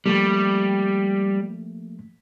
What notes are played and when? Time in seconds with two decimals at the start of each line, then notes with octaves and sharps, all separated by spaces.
0.06 F3 G3 A3 A#3